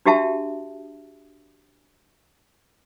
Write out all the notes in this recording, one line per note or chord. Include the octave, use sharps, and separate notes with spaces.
D4 F#4 G4 E5 A5